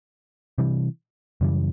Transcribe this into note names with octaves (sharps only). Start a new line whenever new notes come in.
C3 E3 G3
F#2 C#3 E3 G3